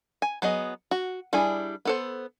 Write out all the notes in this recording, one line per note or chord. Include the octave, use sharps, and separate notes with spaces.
G#5
F#3 B3 G#4 D#5
F#4
G3 D4 E4 G#4 G#5
B3 A4 C5